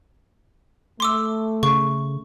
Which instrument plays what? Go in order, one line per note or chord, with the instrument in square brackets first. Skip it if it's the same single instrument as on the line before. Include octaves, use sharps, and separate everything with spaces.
[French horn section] A3 [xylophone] C6 D6 E6
[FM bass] C#3 [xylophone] C#6